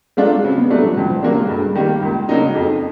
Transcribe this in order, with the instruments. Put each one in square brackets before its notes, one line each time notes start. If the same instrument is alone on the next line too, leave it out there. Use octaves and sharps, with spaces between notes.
[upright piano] F#3 A3 D4 F4 [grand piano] G#3
[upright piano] C#3 [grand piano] C4
[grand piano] B3
[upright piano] F#3 A3 D4 [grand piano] G3
[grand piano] F3
[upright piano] C#2 [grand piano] E3
[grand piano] F3
[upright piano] C#3 F#3 A#3 D4 [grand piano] G3
[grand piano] G#3
[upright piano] G2 [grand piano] A3
[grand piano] G#3
[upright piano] D#3 G3 A#3
[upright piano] C#2 [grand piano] A#3
[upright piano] C#3 F#3 A#3 D#4 [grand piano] D4
[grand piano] D#4
[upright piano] F2